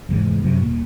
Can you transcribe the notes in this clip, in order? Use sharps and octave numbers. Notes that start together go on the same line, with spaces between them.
F1 E2 G#2
F#2 C3
D#1 A#2